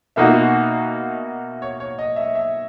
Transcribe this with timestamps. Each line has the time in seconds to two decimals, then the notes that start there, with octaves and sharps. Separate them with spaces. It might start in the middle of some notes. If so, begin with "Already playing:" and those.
0.16 B2 A#3 D#4 F#4 E5
1.62 C#5
1.80 C#5
1.99 D#5
2.16 E5
2.35 E5